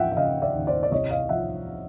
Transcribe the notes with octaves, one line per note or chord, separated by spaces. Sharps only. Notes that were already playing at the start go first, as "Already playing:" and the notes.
Already playing: D#2 F3 E5 F#5 G5
E5
C#3 D#5 F5
D5 E5
D#2
C5 D5
D5
C2 C#5 D#5
D#5 F5
F3 E5 F#5